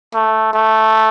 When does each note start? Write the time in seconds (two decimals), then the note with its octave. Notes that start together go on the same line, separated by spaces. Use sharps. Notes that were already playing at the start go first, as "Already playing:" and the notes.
0.14 A3
0.53 A3